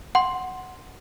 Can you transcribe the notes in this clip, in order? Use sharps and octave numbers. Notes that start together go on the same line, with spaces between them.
F#5 C6